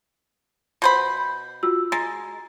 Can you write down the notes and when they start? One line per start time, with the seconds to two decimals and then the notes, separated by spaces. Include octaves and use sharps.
0.82 B2 C5 B5
1.63 F4 F#4 E6
1.92 G#3 A#5 A6